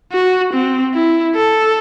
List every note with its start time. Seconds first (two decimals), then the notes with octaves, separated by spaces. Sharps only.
0.12 F#4
0.53 C4
0.94 E4
1.36 A4